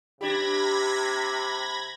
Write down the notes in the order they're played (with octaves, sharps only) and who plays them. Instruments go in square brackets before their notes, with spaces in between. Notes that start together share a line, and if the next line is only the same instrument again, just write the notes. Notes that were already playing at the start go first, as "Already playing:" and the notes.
[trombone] C3 [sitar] D4 G4 [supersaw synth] B5 G#6 A#6